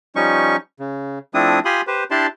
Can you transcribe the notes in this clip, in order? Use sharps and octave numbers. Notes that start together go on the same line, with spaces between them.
F3 G3 C#4 D#4 C#6
C#3
F3 A3 C4 D4 E4 D#6
F4 G4 G#5 B5 C6 D#6
G4 B4 C5
D4 E4 G4 D5 A5 C6